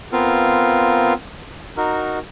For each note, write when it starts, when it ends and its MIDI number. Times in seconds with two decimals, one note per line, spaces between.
0.13 1.13 59
0.13 1.13 60
0.13 1.13 65
0.13 1.13 70
0.13 1.13 77
1.77 2.19 63
1.77 2.19 66
1.77 2.19 70